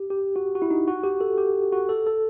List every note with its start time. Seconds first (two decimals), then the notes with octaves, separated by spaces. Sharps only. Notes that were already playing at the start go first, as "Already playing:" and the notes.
Already playing: G4
0.10 G4
0.36 F#4
0.55 F#4
0.62 E4
0.71 D#4
0.88 F#4
1.04 G4
1.21 A4
1.38 G4
1.72 F#4
1.89 A4
2.07 A4